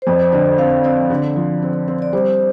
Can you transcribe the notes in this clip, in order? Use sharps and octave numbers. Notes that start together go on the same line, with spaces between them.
C5
F2 D5
D3 D5
C4 F5
C4 D5
D3
F3
C4
C4
D5
G3 C5